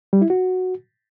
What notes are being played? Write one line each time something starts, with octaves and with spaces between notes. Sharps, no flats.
G3
E4
F#4